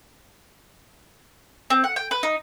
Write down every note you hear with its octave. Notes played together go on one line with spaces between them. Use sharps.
C4
F#5
G5
B4
D#4